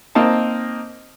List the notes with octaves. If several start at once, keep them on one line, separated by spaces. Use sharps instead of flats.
A#3 C4 D#4 A5